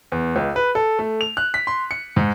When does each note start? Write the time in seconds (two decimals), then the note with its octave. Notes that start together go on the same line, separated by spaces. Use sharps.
0.12 E2
0.36 C#2
0.56 B4
0.75 A4
0.99 A3
1.21 F7
1.37 F#6
1.54 B6
1.67 C6
1.91 C#7
2.16 G#2